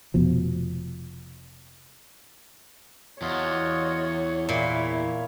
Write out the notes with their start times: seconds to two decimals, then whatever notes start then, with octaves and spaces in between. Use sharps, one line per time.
0.14 F1 B2 F3
3.22 E2 F4 F#4 C#5 D#5
4.49 A#2 A#3 E4 C#5